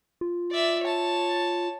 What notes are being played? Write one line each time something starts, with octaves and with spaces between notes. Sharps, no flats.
F4
D5 E5
C#5 A5